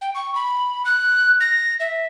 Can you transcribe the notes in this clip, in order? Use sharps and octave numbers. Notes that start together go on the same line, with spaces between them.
G5
C#6
B5
F#6
A#6
E5